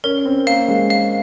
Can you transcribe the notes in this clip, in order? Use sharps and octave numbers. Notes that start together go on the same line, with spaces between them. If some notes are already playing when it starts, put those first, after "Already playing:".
C#4 A#4
C4
A#3 F5
G#3
F5